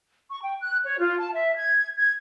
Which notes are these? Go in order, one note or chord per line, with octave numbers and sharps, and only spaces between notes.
C#6
G5
F#6
C#5
F4
A5
E5
G#6
G#6